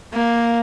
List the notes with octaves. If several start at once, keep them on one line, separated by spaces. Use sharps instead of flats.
A#3